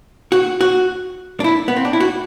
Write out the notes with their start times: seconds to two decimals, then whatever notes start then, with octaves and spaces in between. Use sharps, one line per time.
0.32 F#4
0.61 F#4
1.40 D4
1.44 E4
1.68 B3
1.76 C4
1.85 D4
1.93 E4
2.00 F#4